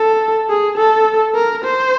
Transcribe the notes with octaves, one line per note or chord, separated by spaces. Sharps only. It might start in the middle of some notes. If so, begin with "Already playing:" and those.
Already playing: A4
G#4
A4
A#4
C5